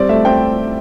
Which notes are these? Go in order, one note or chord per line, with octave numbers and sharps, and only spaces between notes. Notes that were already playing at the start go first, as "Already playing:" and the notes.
Already playing: G3 C4 D5
A3 E5
C4 G5